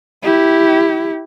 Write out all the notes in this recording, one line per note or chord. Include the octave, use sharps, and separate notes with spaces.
E4 G4